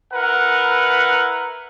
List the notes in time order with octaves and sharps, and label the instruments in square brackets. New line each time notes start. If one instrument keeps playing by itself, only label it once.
[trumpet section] E4 A#4 B4 F#5